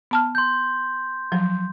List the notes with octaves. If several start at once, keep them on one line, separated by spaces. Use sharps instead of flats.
B3 A5 F6
C6 G6
F3 F#3